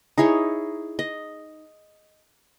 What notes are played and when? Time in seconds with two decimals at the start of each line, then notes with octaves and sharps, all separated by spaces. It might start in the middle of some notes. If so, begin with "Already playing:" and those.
0.18 D#4 E4 G#4 C#5
0.99 D#5